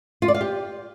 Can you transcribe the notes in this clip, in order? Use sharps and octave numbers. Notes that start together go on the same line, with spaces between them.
F4
D5
F5
G4